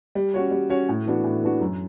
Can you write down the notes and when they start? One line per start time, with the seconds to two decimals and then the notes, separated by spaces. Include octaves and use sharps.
0.15 G3
0.34 C#4 F#4 C#5
0.51 G3
0.70 C#4 F#4 C#5
0.89 A2
1.06 E3 B3 D4 F#4
1.24 A2
1.43 E3 B3 D4 F#4
1.61 F#2